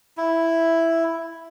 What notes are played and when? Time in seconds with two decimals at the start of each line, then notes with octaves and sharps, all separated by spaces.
0.17 E4